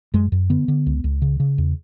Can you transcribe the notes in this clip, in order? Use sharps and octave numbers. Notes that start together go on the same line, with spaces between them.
F#2 G#3
F#2
D3 B3
D3
C#2
C#2
C#3
C#3
E2